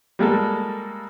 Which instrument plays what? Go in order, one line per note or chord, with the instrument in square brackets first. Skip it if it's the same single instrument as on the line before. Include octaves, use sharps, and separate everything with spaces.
[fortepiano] G3 G#3 A#3 A4